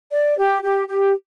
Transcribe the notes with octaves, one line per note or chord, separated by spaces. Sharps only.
D5
G4
G4
G4